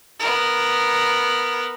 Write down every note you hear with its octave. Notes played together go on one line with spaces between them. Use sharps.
B3 A#4